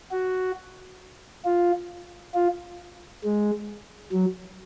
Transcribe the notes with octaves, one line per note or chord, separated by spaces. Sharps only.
F#4
F4
F4
G#3
F#3